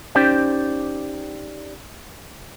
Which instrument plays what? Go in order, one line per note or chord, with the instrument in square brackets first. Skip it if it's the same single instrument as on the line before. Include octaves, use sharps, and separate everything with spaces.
[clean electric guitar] C#4 D#4 G4 C5 D5 G5